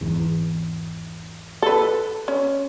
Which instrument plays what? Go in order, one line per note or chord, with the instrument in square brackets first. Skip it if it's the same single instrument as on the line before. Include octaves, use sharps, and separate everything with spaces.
[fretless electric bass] G#1 E2
[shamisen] A4 B4
C#4